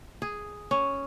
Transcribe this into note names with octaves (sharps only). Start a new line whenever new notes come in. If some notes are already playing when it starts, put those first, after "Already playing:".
G#4
C#4